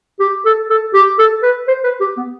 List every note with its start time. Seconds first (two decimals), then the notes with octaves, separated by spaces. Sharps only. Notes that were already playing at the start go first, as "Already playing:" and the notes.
0.20 G4
0.45 A4
0.70 A4
0.94 G4
1.19 A4
1.43 B4
1.68 C5
1.84 B4
2.00 G4
2.17 B3